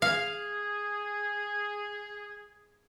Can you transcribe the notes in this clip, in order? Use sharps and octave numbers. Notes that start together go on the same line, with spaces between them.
G#4 F5